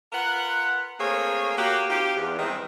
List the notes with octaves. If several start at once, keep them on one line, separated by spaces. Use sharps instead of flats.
F4 A#4 B4 F#5
A3 A#3 C4 G#4 A#4 C#5
A#3 F#4 G4
C4 D#4 F4 G4
E2
G2 D#3 E3 G#3 C4 D#4